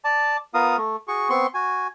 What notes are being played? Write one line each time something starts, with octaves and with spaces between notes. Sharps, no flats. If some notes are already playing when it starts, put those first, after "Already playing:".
D5 A5
B3 F4 A#4 F5 D#6
A3
F#4 G#4 C#6
B3 C4 C6 C#6
F#4 G#5